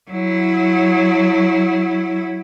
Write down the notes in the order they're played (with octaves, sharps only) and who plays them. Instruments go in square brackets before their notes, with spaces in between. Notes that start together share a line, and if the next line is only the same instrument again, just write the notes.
[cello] F#3 E4